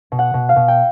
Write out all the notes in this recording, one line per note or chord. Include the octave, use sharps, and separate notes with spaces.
B2
F#5
B2
F5
B2
G5